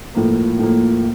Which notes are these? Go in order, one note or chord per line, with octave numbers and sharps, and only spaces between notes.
A2 F3 A#3
A2 F3 A#3